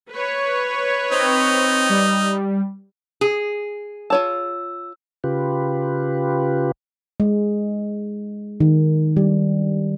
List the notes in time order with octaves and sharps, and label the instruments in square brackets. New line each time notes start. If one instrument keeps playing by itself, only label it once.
[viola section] B4 C#5
[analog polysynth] C4 [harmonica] D#4
[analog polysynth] G3
[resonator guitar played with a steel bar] G#4
[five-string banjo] F4 C#5 A5 [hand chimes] E6
[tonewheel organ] C#3 F4 G4 B4
[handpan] G#3
D#3
G3